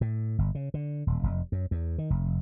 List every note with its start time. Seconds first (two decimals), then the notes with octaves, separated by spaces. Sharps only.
0.01 A2
0.38 G1
0.55 C#3
0.74 D3
1.07 D#1
1.23 F1
1.52 F#2
1.71 E2
1.98 D#3
2.10 F1